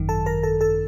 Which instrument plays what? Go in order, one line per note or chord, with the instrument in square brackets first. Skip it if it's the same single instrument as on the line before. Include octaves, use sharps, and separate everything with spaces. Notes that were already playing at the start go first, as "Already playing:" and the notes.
Already playing: [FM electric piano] G#1 F#2 D#3
A4 A5
A#4 A#5
A4 A5
A4 A5